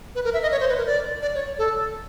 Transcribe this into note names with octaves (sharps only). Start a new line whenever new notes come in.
B4
A#4
E5
D#5
C#5
C5
B4
A#4
D5
D5
C#5
A4